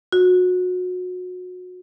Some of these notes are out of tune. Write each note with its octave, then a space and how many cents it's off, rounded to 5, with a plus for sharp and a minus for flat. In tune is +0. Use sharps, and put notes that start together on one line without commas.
F#4 -30